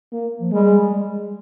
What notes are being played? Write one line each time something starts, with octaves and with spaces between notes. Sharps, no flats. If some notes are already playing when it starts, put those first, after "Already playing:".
A#3
F3
G3 G#3